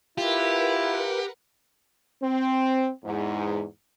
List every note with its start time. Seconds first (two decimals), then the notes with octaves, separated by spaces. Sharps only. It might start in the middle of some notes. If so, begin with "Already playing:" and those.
0.18 E4 F4 G4 A#4 B4 F#5
2.22 C4
3.05 E2 G#2